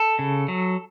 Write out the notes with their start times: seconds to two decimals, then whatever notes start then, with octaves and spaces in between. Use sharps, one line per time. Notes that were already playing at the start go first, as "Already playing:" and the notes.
Already playing: A4
0.19 C#3
0.48 F#3